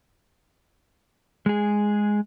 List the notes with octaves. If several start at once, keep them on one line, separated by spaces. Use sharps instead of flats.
G#3 G#4